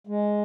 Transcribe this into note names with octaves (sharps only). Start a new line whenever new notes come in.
G#3